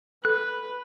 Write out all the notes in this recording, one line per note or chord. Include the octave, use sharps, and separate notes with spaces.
A4 B4 F#6